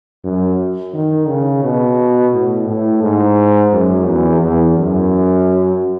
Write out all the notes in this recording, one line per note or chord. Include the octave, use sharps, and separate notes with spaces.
F#2
D#3
C#3
B2
A2
A2
G#2
F#2
E2
E2
F#2